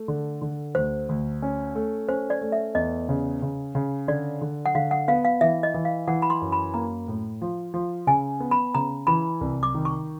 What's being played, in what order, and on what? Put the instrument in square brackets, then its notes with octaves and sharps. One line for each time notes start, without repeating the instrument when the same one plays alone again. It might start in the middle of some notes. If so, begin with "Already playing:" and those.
Already playing: [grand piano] A3
D3
D3
[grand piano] D2 [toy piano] C5
[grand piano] D2
C#4
A3
[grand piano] C#4 [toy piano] C5
[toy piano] D5
[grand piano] A3
[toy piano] E5
[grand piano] E2 [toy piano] D#5
[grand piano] C#3
C#3
C#3
[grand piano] D3 [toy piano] D5
[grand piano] D3
[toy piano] F#5
[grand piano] D3 [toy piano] F5
[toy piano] F#5
[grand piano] B3 [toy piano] F5
[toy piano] F5
[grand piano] E3 [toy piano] E5
[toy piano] D#5
[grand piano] E3
[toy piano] F5
[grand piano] E3 [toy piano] F#5
[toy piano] B5
C6
[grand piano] F#2
[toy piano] B5
[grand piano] A#3 [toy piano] A#5
[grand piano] A2
F3
F3
[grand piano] C#3 [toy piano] G#5
[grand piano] B3
[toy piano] B5
[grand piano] C#3 [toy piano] A#5
[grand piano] E3 [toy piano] B5
[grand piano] C2
[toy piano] D6
[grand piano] D#3
[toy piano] C#6